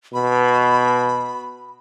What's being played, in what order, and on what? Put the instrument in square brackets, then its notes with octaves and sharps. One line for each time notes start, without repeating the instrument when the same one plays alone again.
[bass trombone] B2 [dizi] B5